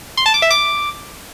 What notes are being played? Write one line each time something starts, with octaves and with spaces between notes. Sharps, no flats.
C6
A5
D6
E5
D6